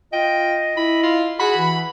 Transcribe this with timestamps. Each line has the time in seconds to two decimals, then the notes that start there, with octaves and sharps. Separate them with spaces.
0.13 F4 D#5 G5
0.77 E4 B5
1.03 F4
1.39 F#4 G#4 B5
1.57 E3